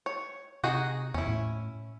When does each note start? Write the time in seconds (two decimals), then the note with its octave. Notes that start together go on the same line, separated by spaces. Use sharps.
0.06 C#5
0.64 C3 D#4 F#4 G#4
1.14 E2 C#4 E4
1.27 A2